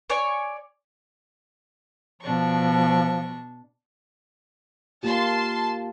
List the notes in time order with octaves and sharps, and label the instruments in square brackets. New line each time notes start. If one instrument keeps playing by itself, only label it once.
[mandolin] C#5 D5 G#5 C#6
[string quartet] B2 D4 C#6 [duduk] F3
[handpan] A#3 F4 G4 [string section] A5 C6